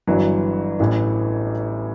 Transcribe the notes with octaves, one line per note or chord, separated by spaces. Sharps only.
G1 G2 E3 F#3
A1 A2 E3